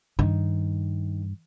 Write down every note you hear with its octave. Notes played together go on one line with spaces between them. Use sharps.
G2 D#3